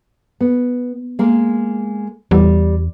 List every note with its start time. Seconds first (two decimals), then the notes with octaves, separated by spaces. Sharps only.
0.41 B3
1.19 G#3 A#3 A#4
2.31 E2 G3